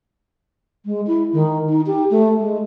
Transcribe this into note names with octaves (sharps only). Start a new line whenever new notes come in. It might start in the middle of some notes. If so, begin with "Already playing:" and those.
G#3
E4
D#3
D#4
G4
A3
G#3